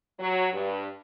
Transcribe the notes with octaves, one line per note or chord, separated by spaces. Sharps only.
F#3
G2